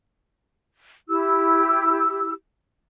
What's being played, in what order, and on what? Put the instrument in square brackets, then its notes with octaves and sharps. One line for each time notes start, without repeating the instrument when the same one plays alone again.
[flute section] E4 G4 E6